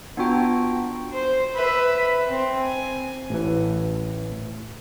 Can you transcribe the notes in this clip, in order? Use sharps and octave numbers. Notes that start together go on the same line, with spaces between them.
B3 D4 F4 F#4 G5 A#5
C5
B4 E5
C4
G#5
A1 E3